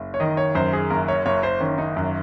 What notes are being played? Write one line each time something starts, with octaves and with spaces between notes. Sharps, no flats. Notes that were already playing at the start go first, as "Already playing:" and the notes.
Already playing: F#1
C#5
D#3 D#5
C#5
F#2 C5
G#4
F#1 A#4
C#5
F#1 C#5
C5
D#3 C#4
D#4
F#2